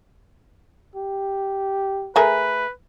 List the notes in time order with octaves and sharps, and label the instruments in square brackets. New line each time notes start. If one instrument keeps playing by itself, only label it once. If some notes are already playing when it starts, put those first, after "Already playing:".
[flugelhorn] G4
[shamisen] A3 G#4 A#4 [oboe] B4